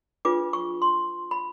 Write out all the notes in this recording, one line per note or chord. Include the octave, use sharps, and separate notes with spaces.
D4 F4 G#4 B4 D6
C#6
C6
B5